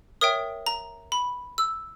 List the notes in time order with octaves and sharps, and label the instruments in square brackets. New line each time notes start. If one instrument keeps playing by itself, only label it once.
[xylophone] A#4 C#5 E5 G5 D#6
A#5
B5
E6